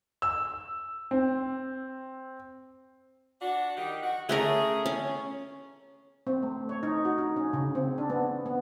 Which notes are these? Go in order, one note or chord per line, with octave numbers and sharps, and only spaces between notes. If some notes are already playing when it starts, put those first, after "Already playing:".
E6
C4
D4 F#4
D#3 D#4 G4
F#4
A3 C#4 G#4 A#4
C#4
C4
A3
C#5
D#4
F#4
D#4
C#4
C#3
C4
D4
B3
B3